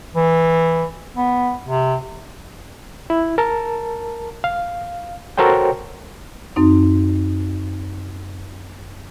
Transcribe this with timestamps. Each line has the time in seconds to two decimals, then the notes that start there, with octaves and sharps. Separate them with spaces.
0.15 E3
1.16 B3
1.67 C3
3.10 E4
3.38 A#4 A5
4.44 F5
5.38 F#4 A4 A#4 C5 C#5 G5
6.56 F#2 C4 D#4